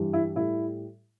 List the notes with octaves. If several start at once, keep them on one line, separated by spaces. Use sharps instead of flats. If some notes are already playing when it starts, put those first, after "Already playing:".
Already playing: G2 E3 G3
E4
A2 G3 E4